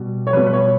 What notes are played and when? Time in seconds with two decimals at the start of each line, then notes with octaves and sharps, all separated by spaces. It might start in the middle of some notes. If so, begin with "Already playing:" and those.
Already playing: B2 G3
0.27 C#5
0.33 B2 G3 B4
0.46 B4
0.53 C#5